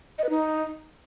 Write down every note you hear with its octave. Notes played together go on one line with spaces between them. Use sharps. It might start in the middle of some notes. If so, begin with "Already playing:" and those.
D#5
B4
D#4